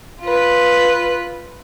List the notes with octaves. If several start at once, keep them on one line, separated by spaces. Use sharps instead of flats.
F4 B4